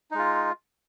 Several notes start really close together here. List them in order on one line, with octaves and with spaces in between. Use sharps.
D#4 G#3 F4